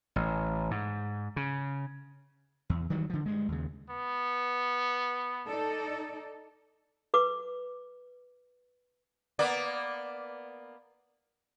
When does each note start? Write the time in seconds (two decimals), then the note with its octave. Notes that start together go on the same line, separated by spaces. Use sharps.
0.16 A1
0.71 G#2
1.36 C#3
2.70 E2
2.90 D#3 E3 F#3 G3
3.10 D3 F3
3.26 G2 G#3
3.48 D#2 C#3
3.90 B3
5.48 D#4 A4 D5
7.14 B4 D6
9.39 A#3 B3 D5